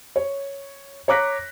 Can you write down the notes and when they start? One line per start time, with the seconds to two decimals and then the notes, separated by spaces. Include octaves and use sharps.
0.16 C#5
1.08 C#5 A#5 D6 F#6 A#6 B6